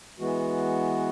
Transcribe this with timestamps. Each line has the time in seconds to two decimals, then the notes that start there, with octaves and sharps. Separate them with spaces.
0.19 E3 G#3 B3 F#4